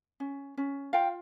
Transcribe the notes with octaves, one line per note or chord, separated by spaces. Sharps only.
C#4
C#4
F4 F5 G5